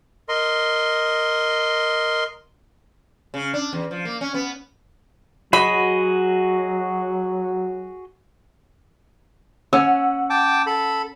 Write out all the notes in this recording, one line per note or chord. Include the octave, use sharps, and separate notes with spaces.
A#4 D#5 C6
C#3
D4
E2
F3
A#3
C#4
B3
F#3 F#4 G#4 D#5 B5
C#4 F#5 E6
G5 A5 D6
A4 B5